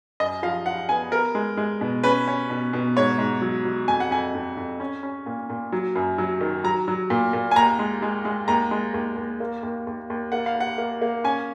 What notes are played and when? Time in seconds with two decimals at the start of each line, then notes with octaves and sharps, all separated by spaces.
0.20 F#2 D#5
0.43 F3 F5
0.66 F3 F#5
0.89 B3 G#5
1.12 B3 A#4
1.35 G#3
1.57 G#3
1.81 B2
2.03 C#4 B4
2.28 C#4
2.50 B2
2.73 B2
2.96 G#2 C#5
3.18 G#2
3.42 F#3
3.65 F#3
3.88 F2 G#5
4.00 F#5
4.11 F2 G#5
4.35 F2
4.57 F2
4.80 C#4
5.03 C#4
5.26 A#2
5.50 A#2
5.72 F#3
5.96 F#2
6.18 F#3
6.41 D#3
6.64 F#3 A#5
6.88 F#3
7.10 A#2
7.33 A#2
7.51 G#5
7.56 D#2 A#5
7.79 G#3
8.02 G#3
8.25 G#3
8.48 D#2 A#5
8.71 G#3
8.94 D#2
9.17 D#2
9.40 A#3
9.63 D#2
9.87 D#2
10.10 D#2
10.32 A#3 F#5
10.46 F5
10.56 A#3 F#5
10.78 A#3
11.02 A#3
11.24 C#4 G#5